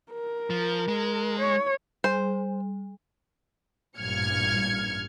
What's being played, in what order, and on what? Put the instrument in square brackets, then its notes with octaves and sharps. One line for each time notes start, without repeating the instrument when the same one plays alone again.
[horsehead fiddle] A#4
[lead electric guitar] F3
G#3
[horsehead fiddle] C#5
[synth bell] G3 [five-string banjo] C5
[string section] A1 G2 A#2 F6 G#6 C#7